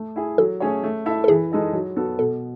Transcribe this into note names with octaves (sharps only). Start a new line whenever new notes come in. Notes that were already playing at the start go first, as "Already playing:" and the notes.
Already playing: A3
E4 G#4
F#3 A4
A3 C#4 G#4 C#5
A3
E4 A4 E5
A4
E3 G#4
G#3 D#4 A4 D#5
F#3
B3 F#4 A4
B2 A4